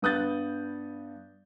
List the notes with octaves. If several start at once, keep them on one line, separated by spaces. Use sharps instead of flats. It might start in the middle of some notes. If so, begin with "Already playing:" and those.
G2 B3 D#6 F#6 G6 A6